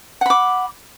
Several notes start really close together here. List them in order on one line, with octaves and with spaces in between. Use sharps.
F#5 B5 D6